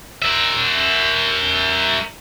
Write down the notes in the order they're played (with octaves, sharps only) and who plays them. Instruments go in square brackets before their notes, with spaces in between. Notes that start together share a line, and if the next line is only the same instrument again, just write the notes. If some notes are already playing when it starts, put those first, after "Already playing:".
[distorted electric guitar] A#4 E5